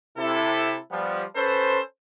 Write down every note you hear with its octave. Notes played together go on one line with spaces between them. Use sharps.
C3 E4 A4
F3 G3 B3
C#4 A4 B4 C5